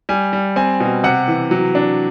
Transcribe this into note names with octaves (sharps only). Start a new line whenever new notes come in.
G3 G#5
G3
C4 G#5
B2
C3 F#5
E3
F#3
D4